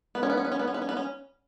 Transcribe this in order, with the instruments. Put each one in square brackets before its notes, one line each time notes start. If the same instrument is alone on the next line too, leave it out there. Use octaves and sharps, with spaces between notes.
[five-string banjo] B3
C#4
B3
C#4
B3
C#4
B3
C#4
B3
C#4
B3
C#4